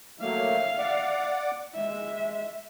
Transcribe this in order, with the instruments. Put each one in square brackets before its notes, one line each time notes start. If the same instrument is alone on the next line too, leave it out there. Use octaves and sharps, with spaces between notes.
[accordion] F#3 A3 A#3 [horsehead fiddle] E5 F5
[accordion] D5 F#5 D6
[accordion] G#3 [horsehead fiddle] E5